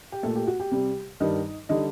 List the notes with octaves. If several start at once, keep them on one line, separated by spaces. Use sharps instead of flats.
G4
A#2 A3 A4
G4
F#4
G4
C3 G3
G2 D#3 G3 D#4 D#5
D3 G3 D#4 D#5